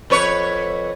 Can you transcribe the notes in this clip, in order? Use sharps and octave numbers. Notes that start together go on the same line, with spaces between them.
F2 B4 C#5